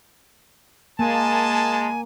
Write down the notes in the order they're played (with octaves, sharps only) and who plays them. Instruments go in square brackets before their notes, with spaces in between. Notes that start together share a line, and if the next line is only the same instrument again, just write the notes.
[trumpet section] G#3 A5 [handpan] A#3 [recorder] G#5